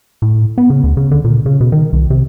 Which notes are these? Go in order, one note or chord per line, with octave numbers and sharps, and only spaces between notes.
A2
B3
C#3
D2
C#3
D3
A#2
C#3
B2
D#3
C2
C3